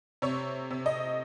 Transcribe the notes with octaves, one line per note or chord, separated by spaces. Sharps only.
C3 C#5
C3
D#5